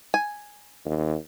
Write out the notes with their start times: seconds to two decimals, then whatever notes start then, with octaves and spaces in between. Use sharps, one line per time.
0.14 G#5
0.86 D#2